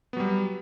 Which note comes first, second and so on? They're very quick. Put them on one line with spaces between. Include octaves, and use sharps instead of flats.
B3 F#3 G3